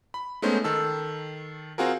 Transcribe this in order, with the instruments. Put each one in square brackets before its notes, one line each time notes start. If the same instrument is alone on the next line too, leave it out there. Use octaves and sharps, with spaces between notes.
[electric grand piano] B5
G#3 A3 B3 C#4 D#4 C5
D#3 A4 E6
C4 F4 F#4 G#4 A#4